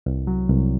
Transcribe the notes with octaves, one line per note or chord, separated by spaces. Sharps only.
C2
F#3
C2